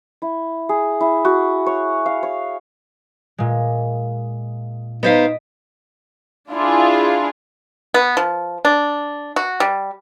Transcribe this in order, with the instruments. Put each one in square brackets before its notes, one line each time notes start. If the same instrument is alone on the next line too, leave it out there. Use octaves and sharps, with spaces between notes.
[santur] E4
G#4
E4
F#4
C#5
F5
C#5
[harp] A#2 G#3
[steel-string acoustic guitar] B3 C5 F5 [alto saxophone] D#4 [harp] D#5 B6 D7
[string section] D4 E4 F4 G#4
[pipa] B3
F3
D4
F#4
G3